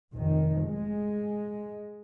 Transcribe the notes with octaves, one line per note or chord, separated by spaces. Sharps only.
F1 D#3
G#3